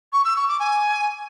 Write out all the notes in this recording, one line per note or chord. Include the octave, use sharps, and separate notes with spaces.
C#6
E6
C#6
D6
G#5